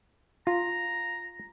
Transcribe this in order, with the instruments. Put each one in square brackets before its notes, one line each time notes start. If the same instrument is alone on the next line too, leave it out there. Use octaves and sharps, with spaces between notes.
[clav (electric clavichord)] F4 [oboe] A#5